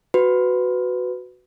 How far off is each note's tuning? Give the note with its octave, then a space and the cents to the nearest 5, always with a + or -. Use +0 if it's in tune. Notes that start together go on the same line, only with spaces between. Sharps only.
F#4 +0 B4 +15